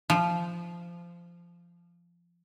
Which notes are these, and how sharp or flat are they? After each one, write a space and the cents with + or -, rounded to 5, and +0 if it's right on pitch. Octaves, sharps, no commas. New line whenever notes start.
F3 -15